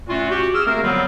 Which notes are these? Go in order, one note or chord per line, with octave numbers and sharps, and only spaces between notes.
A#2 A3 C#4 F4 F#4
F#4 G4
G#4 E6 F6
A3 A#3 C4 A#4
D3 F#3 G3 B3 C4 F4